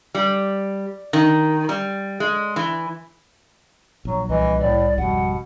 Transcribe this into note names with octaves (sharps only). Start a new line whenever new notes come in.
G3
D#3
G3
G#3
E3
A#1 F#3
C2 E3 D#5
A2 D5
G#1 F2 B2 G3 F#5